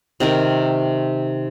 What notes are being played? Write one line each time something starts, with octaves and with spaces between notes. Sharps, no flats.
C3 D#3 A#4 A#5